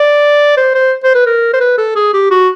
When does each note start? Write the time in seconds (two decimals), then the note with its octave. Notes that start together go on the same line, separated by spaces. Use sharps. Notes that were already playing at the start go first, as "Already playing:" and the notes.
Already playing: D5
0.57 C5
0.75 C5
1.04 C5
1.15 B4
1.26 A#4
1.54 C5
1.61 B4
1.78 A4
1.96 G#4
2.14 G4
2.31 F#4